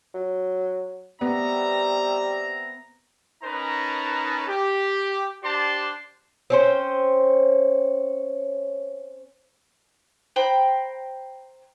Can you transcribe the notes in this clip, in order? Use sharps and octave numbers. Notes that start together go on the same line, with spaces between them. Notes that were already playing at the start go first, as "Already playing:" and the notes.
F#3
G3 B3 C4 E5 A#5
C#4 D#4 A#4 B4 A5 A#5
G4
D4 G4 C5 D5 A5 C6
C4 C#4 C5
C5 G5 A#5 B5